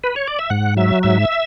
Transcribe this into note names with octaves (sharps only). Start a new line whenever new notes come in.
B4
C#5
D5
E5
G#2 F#5
F#3 E5
G#2 E5